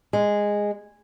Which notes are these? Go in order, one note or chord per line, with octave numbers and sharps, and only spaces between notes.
G#3